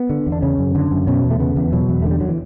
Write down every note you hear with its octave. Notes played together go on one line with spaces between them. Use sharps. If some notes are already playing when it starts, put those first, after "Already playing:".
Already playing: B3
D3
E2
D4
C#3 C#4
F#2
D3
F#2
B2 C#4
E2
A3
C#3 B3
E2
B2 F#3
E2
A3
D3
G3
F#3
E3